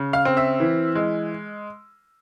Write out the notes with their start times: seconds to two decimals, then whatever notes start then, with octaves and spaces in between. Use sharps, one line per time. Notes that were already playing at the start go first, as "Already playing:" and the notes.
Already playing: C#3
0.13 F5 F6
0.25 C4
0.37 E5 E6
0.60 E3
0.95 G#3